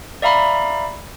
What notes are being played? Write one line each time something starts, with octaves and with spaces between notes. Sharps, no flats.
D5 E5 F5 A#5 B5